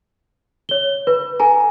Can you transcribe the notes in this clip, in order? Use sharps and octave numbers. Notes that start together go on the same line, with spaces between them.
C#5 G7
B4
A4 G#5 A#5